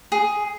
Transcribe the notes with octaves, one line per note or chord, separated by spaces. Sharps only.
G#4